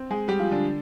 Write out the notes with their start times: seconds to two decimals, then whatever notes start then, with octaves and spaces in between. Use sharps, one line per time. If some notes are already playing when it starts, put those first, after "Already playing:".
Already playing: C4
0.11 G#3 G#4
0.28 G3 G4
0.39 F3 F4
0.51 D3 D4